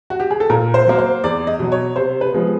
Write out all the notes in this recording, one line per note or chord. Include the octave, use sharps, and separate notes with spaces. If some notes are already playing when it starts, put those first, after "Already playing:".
F#4
G4
G#4
A4
A#2 A#4
C5
F#3 A#3
C5
E2 D5
D#5
B2 F#3
C#5
C3 C5
B4
F3 G#3 B3